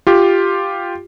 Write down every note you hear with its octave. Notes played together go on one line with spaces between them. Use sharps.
F4 G4